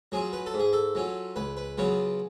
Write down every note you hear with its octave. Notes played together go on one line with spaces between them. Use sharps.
F#3 C#4 F4 G#4
B4
A4
G#2
G#4
A4
F#3 C#4 F4
C#2 B4
B4
C#3 F#3 B3 F4 C#5